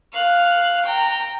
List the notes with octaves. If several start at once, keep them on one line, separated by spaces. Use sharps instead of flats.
F5 F#6
G5 A#5